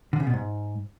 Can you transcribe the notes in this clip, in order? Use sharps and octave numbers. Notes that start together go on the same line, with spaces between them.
D3
C#3
B2
G#2